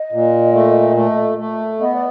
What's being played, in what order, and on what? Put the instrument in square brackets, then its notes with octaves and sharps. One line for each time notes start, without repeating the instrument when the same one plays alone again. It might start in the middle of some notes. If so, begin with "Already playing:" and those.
Already playing: [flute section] D#5
[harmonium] A#2
A3
A3
A3
[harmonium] B3 [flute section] D#5
[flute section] D5